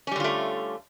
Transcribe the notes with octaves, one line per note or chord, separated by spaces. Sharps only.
D3 G3 A3 C#4 F4